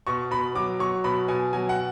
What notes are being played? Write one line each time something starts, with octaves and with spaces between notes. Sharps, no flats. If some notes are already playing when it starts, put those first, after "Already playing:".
B2 C#6
B2 B5
F#3 D6
F#3 C#6
B2 B5
B2 G#5
F#3 G#5
F#5